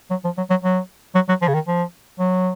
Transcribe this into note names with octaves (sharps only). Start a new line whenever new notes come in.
F#3
F3
F#3
F#3
F#3
F#3
F#3
F3
C#3
D#3
F3
F#3